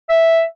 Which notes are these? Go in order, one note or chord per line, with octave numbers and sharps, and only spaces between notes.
E5